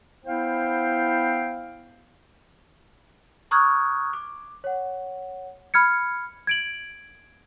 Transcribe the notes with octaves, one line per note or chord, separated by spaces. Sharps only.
B3 E4 C5 F5 G5
A#5 C#6 D#6 F6 F#6 G#6
D6
C#5 F#5
B5 F6 G#6 C#7
G#6 D7 F#7